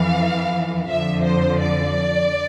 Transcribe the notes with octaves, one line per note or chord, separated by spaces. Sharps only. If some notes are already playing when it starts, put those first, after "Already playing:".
Already playing: F2 E3 F5
F2 D3 F3 E5
C5
D5